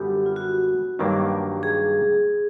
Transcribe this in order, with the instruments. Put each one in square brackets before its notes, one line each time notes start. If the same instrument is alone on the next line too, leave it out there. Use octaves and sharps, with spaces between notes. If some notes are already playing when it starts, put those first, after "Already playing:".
Already playing: [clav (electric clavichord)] F#2 D3 G3 B3 [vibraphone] G4
[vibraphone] F4
F#4
[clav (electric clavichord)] G2 D#3 F#3 A#3 D4 [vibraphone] G4
[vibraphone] G#4